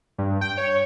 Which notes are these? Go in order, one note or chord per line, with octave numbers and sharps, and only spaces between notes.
G2
G5
C#5